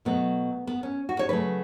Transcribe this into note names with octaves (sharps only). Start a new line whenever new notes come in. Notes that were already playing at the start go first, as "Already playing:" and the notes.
B2 F#3 A3 B3
B3
C#4
F#4
C#5
C#3 F#3 A3 B4